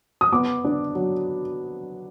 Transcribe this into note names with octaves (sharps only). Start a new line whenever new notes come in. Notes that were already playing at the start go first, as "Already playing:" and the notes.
D#6
B3 D6
D4
F#3